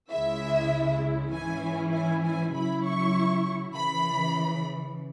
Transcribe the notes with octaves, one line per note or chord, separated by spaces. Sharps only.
C#2 C#3 G#3 E4 E5
G#2 E3 C#4 E4 G#5
G#5
G#5
C#3 F#3 E4 B5
C#6
C#3 E3 B5